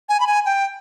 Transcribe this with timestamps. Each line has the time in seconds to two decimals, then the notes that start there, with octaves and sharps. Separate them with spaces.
0.09 G#5
0.20 B5
0.27 G#5
0.46 G5